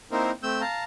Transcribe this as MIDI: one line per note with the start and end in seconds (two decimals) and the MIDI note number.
0.12 0.31 58
0.12 0.31 60
0.12 0.31 63
0.12 0.31 64
0.12 0.31 70
0.12 0.31 72
0.43 0.61 57
0.43 0.61 60
0.43 0.61 88
0.43 0.61 91
0.61 0.84 77
0.61 0.84 81
0.61 0.84 82